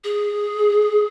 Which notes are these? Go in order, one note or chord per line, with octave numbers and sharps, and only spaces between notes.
G#4